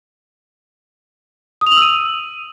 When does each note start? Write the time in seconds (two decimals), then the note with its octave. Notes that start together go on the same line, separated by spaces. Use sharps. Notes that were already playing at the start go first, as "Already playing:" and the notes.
1.61 D#6
1.67 F7
1.72 F#7
1.77 E6
1.82 D#7